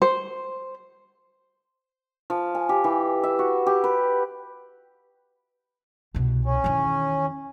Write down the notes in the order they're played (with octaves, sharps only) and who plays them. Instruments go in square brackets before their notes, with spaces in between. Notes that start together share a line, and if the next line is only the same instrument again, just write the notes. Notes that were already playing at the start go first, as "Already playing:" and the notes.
[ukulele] C5
[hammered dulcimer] F3
G#5
G4
E3
E5
F#4
G4
B4
[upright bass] C2 B2
[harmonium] C#4
[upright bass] E2 D#3